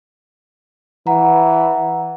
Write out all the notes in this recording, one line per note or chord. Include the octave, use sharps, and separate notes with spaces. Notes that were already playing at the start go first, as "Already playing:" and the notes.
E3 F#5 A#5